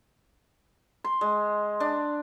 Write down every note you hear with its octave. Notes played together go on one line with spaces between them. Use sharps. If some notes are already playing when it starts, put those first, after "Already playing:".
C6
G#3
D4